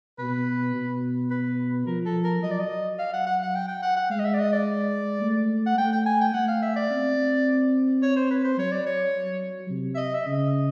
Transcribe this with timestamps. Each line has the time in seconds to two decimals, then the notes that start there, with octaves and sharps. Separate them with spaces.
0.18 B2 B4
0.75 B2
1.30 B4
1.86 F3 A#4
2.06 A4
2.24 A#4
2.43 F#3 D#5
2.51 D5
2.59 D#5
2.99 F5
3.13 F#5
3.26 F#5
3.43 F#5
3.55 G5
3.68 G5
3.82 F#5
3.96 F#5
4.10 G#3 F5
4.19 D#5
4.25 E5
4.34 D5
4.39 D#5
4.52 D5
5.22 A3
5.66 F#5
5.78 A3 G5
5.92 G5
6.06 G#5
6.21 G5
6.34 A3 F#5
6.48 F5
6.62 E5
6.76 D5
6.90 C4
8.02 C#5
8.16 C5
8.31 B4
8.44 C5
8.58 F#3 C#5
8.71 D5
8.86 C#5
9.70 C3
9.95 E5
9.97 D#5
10.14 E5
10.26 C#3 D#5